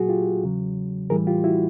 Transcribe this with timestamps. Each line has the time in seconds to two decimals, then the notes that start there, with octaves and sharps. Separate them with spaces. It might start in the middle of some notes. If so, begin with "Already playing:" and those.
Already playing: A#2 F#3 F#4 G#4
0.09 F4 G4
0.43 E2 C#3 F#3
1.10 A2 E3 G3 G#4 A#4
1.27 F4 G4
1.44 E4 F#4